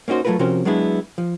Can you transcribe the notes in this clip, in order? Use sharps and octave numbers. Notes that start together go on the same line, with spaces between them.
A#3 C#4 D#4 F#4 C5
F#3 A3 C4 F4 A#4 B4
C3 F3 C#4 F#4 A#4 C5
F#3 G#3 B3 D4 E4
F3